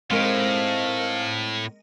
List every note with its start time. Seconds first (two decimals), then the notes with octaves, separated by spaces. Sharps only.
0.11 A2 G#3 C4 D#4 A#4 D#5 F5